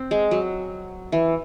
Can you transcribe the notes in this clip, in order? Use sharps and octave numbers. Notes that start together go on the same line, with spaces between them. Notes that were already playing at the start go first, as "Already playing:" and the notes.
Already playing: C4
G#3
F#3
E3